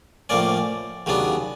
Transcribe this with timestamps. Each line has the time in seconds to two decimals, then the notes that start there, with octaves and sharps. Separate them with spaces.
0.29 A2 F3 A#3 C#4 D5
1.06 D#2 C#3 F#3 B3 D4